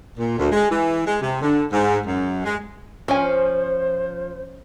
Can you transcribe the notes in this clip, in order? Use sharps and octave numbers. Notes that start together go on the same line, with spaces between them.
A#2
D2
G#3
E3
G#3
C3
D3
G#2
F#2
G#3
F3 C#4 C5 G#5